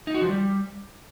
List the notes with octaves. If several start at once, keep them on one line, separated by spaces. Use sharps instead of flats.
D#4
F#4
F3
G3